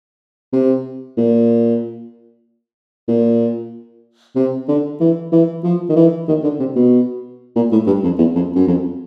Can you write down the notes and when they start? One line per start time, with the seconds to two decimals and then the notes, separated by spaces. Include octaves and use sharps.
0.53 C3
1.17 A#2
3.08 A#2
4.36 C3
4.68 D3
5.00 E3
5.32 E3
5.64 F3
5.89 D#3
5.96 E3
6.28 D#3
6.44 D3
6.59 C3
6.76 B2
7.56 A#2
7.72 A2
7.87 G2
8.04 F2
8.19 E2
8.35 F2
8.56 F#2
8.67 F2